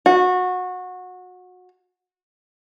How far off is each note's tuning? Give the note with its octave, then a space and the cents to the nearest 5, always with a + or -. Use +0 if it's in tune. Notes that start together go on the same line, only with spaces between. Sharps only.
F#4 -25